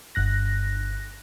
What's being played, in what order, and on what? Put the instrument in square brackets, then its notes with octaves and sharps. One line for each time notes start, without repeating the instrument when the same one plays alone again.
[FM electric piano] G1 G2 F#6 A#6